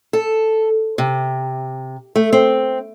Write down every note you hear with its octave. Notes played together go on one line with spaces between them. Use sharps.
A4
C3
A3
C4